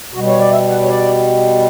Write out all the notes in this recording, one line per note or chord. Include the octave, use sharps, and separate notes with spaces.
B2 G3 F#4
C#5
D5
E5
F#5
C#5
D5